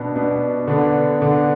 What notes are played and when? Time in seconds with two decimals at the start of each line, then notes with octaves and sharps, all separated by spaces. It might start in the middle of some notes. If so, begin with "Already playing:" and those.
Already playing: B2 B3 D4
0.16 B2 B3 D4
0.67 D3 B3 D4
1.18 D3 B3 D4